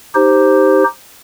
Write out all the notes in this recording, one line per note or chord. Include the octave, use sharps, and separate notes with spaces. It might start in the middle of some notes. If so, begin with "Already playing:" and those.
D#4 G4 C5